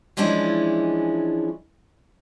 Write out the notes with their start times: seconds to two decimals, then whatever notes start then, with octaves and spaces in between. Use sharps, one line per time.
0.17 E3 F3 G#3 C#4 D4 E4